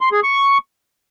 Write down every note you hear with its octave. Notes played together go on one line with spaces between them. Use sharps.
C6
G#4
C#6